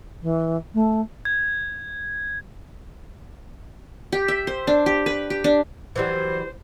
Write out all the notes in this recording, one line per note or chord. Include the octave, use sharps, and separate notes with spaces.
E3
A3
G#6
G4
E5
C5
D4
G4
B4
G4
D4
E3 F#3 G3 C5